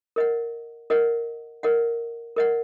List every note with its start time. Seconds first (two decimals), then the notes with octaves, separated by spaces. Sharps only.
0.16 A#4 D#5 F#5
0.90 A#4 D#5 F#5
1.63 A#4 D#5 F#5
2.36 A#4 D#5 F#5